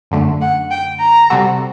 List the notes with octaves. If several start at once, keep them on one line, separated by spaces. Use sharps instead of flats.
F#2 D3 A3
F#5
G5
A#5
C3 G3 C4 F#4 A4